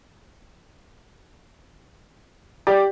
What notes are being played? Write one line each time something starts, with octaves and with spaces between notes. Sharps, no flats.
G4 D5